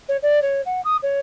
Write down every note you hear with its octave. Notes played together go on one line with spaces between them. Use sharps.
C#5
D5
C#5
F#5
D#6
C#5